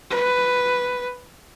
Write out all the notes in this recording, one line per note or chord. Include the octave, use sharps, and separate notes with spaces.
B4